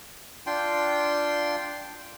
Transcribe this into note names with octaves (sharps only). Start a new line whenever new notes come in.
D4 F4 G5 C6